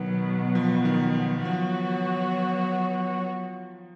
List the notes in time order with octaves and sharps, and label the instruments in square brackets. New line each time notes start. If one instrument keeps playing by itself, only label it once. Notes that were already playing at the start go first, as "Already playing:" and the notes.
Already playing: [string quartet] B2 F#3 B3 [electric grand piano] D#3
[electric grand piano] F3
D#3
[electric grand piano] F3 [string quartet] F#3 B3 F#4 C#5